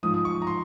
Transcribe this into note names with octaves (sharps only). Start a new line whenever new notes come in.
G#2 F3 D#6
D#6
C#6
A#5
C6